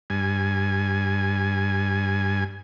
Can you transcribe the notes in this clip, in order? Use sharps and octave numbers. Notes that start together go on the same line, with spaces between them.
G2 G#5